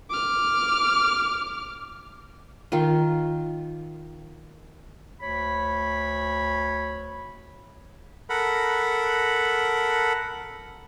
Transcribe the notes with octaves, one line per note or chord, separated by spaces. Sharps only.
D6 F6
D#3 F4
D2 C#5 B5
A4 A#4 F#5 B5